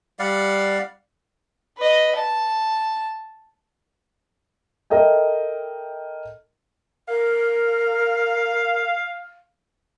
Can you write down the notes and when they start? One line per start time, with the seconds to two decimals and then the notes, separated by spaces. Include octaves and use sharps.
0.19 G3 D5 F5 F#5
1.77 B4 D#5
2.15 A5
4.90 A4 A#4 D#5 E5 G5
7.08 A#4 F5